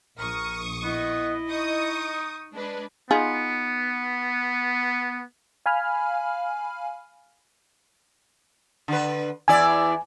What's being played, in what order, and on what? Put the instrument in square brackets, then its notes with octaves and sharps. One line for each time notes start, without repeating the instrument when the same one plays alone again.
[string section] A#1 C#6 D#6 [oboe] A#4
[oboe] B3 [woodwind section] E4 D#5
[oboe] D#4 [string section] C#6 D#6
[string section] G#3 D4 B4
[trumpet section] B3 [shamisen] D#4 F4 G#4
[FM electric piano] F5 G#5 B5 F6
[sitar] D3 B4
[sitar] E2 E4 D5 [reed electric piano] G#5